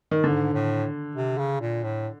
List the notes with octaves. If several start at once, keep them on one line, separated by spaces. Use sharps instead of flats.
D#3
G#2 D3
A2
C3
C#3
A#2
A2